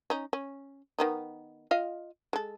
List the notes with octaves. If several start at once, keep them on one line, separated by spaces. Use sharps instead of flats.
C#4 D#4
C#4
D#3 B3 D#4
F4 D#5 F5
G#3 A4